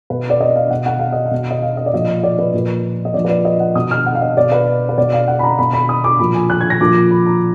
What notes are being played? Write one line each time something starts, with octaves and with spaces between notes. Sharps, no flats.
B2 B4
D5
D#5
F5
B2 F#5
F#5
F5
D#5
F5
B2
D#5
F5
D#5
D5
A#2 F3 D#5
D5
B4
A#2 F3
D#5
A#2 F3 D5
B4
D5
D#5
F#5
B2 D#6
F6
F#5
F5
D#5
B2 D5
B4
B4
B2 D5
F5
F#5
B5
A#5
B2 B5
B5
D#6
D6
A#2 F3 B5
G#5
F#6
G#6
A#6
A#2 F3 D6
B5
A#5